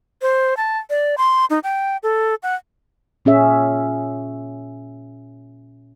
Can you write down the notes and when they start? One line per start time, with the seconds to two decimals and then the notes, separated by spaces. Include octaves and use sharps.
0.22 C5
0.57 A5
0.90 D5
1.18 C6
1.50 D#4
1.64 G5
2.03 A4
2.43 F#5
3.25 A#2 C#4 G#4 E5